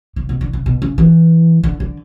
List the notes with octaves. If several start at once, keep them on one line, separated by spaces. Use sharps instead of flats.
C#3
B2
D3
C#3
B2
C#3
E3
D3
D3